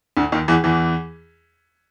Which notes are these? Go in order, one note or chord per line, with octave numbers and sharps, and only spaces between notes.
D2 D3
D#2 D#3
E2 E3
E2 E3